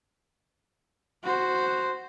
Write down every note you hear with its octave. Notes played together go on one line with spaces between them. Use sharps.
F#4 C5